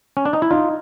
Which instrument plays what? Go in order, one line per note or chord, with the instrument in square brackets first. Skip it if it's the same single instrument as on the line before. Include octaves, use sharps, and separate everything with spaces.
[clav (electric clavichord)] C#4
D4
D#4
E4
[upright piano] D#4 [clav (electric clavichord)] F4